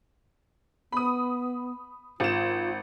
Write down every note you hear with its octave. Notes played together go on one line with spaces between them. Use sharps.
B3 B5 D#6
G#1 F4 E7